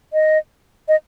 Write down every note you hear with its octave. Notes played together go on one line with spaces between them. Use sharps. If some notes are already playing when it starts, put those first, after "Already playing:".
D#5
D#5